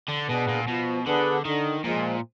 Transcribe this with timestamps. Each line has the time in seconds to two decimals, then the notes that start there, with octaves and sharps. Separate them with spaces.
0.08 D3
0.28 B2 B3 D4 G#4 B4
0.48 A#2
0.67 B2 F3
1.06 D3 B3 D4 G#4 B4
1.45 D3 D#3
1.84 A#2 F3 G#3